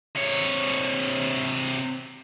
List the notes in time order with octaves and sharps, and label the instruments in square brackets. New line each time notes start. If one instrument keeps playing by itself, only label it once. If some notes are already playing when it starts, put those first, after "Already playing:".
[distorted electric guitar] C3 C#5